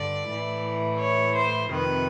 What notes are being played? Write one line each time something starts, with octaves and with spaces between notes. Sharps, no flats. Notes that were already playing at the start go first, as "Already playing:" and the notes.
Already playing: G2 D3 D5
A2 E3
C#5
C5
F2 C3 D#3 B4